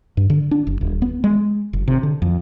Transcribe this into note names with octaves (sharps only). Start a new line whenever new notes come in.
G2
D3
D4
F#1
D#1
B3
G#3
F#1
C3
D3
F2